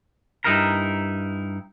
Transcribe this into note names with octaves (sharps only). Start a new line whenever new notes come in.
G2 D#4 E4 A#4 A#5